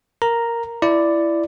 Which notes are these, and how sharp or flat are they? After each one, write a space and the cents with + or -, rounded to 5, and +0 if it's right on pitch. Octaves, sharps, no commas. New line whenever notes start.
A#4 +0 A#5 +0
E4 +20 D5 +0